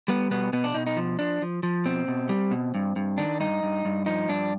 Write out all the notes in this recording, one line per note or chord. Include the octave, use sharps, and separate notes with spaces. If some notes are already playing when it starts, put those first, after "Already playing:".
G3 B3
B2 B3
B2 B3
D4
B2 D#4
D#4
F3
F3 D4
F3
F3
B2 C4
B2
G3
B2
G2
G2
D#3 D4
G2 D#4
G2
G2
F3 D#4
G2 D4